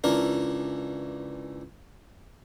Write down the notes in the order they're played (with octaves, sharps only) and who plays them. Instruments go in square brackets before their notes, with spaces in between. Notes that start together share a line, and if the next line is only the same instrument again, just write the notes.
[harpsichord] C#2 E3 D4 A#4